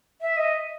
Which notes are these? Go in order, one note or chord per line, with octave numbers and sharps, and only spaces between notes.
E5
D#5